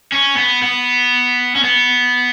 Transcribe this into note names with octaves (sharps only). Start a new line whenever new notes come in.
C#4
B3
B3
C#4
B3